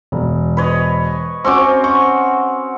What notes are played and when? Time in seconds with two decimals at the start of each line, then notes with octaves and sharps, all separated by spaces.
0.12 E1
0.57 B4 C#5 D#5
1.45 C4 C#4 F#4 C#6 D6
1.84 C#6